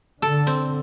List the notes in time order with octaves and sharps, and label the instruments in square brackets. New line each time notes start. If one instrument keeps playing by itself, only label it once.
[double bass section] D3 [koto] A4
[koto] C4